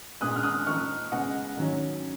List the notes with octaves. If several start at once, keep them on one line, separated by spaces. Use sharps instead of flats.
A#2 G#3 B3 D#4 D#6 F#6
F6
D#6 F#6
F3 A#3 D#4 C#6 F6
C#3 G#3 B3 D#5 F#5
D#3 F#3 C#4